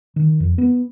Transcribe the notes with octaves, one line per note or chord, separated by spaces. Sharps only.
D#3
F2
B3